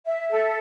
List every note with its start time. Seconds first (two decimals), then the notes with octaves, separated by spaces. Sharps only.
0.06 E5
0.29 A4